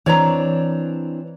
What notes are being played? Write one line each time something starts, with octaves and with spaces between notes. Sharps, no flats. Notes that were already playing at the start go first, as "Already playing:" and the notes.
E3 C4 D4 C#5 D5 A#5